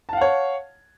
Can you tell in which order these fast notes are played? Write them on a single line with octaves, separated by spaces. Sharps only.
A5 F5 F#5 C#5